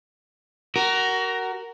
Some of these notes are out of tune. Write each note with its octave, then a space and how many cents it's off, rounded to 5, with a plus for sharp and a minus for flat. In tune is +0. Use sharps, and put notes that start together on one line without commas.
F#4 +25 A#4 +0